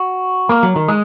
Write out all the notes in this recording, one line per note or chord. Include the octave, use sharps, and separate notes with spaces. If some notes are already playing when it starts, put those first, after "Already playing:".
Already playing: F#4
A#3
F#3
D#3
G#3